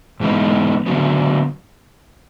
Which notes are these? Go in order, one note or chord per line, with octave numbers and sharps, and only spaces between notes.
G#2 E3 G#3 B3 D#4
D3 F#3 B3